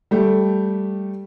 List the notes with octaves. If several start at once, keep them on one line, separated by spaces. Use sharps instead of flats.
G3 A3 G4